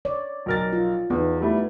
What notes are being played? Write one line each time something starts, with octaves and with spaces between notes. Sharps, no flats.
C#5 D5
B1 A#4 A6
F4
E2 B3 D#4
G3 A3 E4